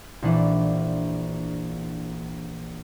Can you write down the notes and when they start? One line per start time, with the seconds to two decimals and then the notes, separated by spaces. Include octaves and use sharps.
0.22 A#1 E3 D4 D#7